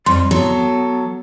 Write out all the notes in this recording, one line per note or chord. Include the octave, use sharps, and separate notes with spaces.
F2 G3 C6
F#3 B3 A4